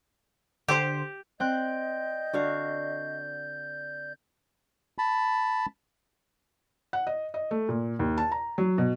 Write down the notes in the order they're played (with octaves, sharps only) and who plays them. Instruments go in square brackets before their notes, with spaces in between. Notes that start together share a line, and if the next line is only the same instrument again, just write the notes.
[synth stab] D3 C5 [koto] G4
[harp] C4 G5 F#6 [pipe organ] D5 G6 [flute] D#5
[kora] D3 F#4 F5
[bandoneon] A5 B5
[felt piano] F#5
D#5
D#5
A3
A#2
D#2
A5
A#5
F#3
B2